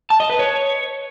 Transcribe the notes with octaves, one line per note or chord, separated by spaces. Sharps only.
A5
D#5
B4
C#5